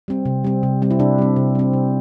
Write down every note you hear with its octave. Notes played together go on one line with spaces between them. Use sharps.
G3 C4
C3
G3 C4
C3
G3 C4
E4
C3 D4
G3 C4
C3
G3 C4
C3